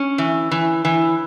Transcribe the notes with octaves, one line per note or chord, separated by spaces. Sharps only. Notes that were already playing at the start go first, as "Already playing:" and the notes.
Already playing: C#4
E3
E3
E3